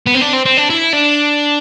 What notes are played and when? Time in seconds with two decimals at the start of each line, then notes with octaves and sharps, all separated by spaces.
0.07 B3
0.15 C4
0.22 D4
0.34 C4
0.46 C4
0.57 D4
0.70 E4
0.93 D4